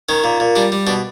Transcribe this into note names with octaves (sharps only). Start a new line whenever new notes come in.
D#3 C#4
A#2
A#2
G3 D4
G3
B2 D4